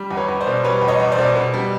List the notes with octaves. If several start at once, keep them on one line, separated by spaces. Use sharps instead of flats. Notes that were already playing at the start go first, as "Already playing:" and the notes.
Already playing: G3
E2
B4 C#5
E2
C5 D5
B2
G3 B4 C#5
E2
C#5 D#5
E2
C5 D5
B2
B2
G3